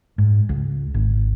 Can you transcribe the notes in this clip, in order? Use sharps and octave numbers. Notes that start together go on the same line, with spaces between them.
G#2
C#2
G#1